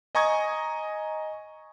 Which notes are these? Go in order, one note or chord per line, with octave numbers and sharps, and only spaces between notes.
D#5 G#5 A#5 C#6 D#6 G#6